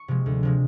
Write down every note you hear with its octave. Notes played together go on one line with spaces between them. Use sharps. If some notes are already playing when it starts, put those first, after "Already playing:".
Already playing: C#6
C3 F3 G#3
D2
C3 F3 G#3